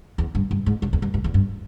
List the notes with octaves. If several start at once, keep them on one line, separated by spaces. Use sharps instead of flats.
E2
G2
G2
G#2
G2
E2
G2
G2
E2
G2